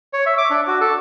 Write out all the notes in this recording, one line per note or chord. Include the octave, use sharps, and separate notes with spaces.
C#5
E5
D6
D4
F#4
A4